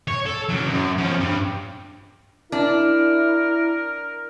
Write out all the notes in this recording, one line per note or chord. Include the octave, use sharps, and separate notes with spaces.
C#5
A4
C#3 F#3
F#2
F3 C#4
G2
D4 E4 A#4